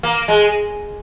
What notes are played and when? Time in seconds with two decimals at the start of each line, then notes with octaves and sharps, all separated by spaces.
0.03 A#3
0.28 G#3